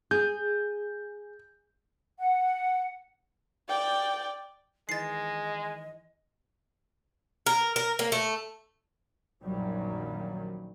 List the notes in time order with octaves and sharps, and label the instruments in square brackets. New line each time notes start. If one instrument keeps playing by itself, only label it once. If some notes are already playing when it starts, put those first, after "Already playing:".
[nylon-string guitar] G#4 [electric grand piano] G6
[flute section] F#5
[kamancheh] D5 G5
[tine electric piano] D#3 E3 E4 [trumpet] G#3 [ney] D#5 [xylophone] A6 C7
[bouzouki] A#4
A#4
A#3
A3
[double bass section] A#1 F#2 A#2 D#3 F#3 G3